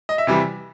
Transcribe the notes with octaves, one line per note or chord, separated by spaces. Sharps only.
D#5
E5
C3 E3 G3